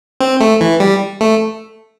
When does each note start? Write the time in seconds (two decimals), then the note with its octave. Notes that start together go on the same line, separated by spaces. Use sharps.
0.20 C4
0.40 A3
0.61 E3
0.80 G3
1.21 A3